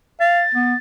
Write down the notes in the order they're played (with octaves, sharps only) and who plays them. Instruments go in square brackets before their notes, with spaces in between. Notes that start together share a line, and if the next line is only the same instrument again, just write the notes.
[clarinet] F5 [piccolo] A6
[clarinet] B3